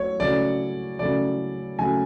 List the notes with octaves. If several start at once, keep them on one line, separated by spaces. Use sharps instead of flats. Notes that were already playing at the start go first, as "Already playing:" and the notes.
Already playing: F#3 A3 C#5
C#3 F#3 A3 D5
C#3 F#3 A3 D5
C#3 F#3 A3 G#5